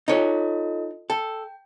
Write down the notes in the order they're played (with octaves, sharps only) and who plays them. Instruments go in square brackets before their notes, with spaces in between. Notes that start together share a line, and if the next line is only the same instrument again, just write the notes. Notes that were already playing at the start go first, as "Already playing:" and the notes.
[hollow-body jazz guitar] D#4 C#5 [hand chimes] F4 A4 D#5
[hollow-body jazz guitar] A4 [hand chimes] G5